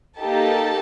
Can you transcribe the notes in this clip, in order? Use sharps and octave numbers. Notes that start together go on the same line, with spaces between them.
A#3 D#4 G4 A4 A5